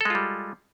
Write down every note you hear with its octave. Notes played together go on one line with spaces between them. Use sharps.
G3 G#3 F4 A4